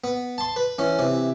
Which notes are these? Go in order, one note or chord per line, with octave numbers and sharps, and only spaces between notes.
B3
A5 C6
B4
E3 C#4
C3 E3